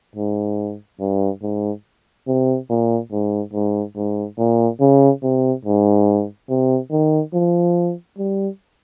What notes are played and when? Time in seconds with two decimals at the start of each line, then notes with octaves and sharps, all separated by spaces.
0.16 G#2
1.00 G2
1.42 G#2
2.28 C3
2.70 A#2
3.12 G#2
3.54 G#2
3.96 G#2
4.39 A#2
4.80 C#3
5.23 C3
5.66 G#2
6.50 C3
6.92 D#3
7.34 F3
8.18 G3